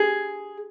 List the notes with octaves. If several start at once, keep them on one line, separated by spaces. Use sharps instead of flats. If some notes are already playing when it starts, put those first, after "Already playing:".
Already playing: G#4